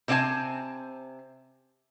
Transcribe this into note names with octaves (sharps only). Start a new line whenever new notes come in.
C3 C4 D4 F4 G#5 A5